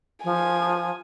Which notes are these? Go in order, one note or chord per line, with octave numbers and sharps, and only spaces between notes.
F3 G#5